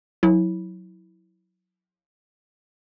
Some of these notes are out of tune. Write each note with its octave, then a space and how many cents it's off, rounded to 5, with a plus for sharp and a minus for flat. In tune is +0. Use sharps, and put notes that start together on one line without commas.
F#3 -15 E4 -15